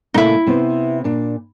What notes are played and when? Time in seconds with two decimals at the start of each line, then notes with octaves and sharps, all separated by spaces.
0.14 A#2 C#3 A3 D#4 E4
0.47 C3 B3 C4
1.04 A#2 D4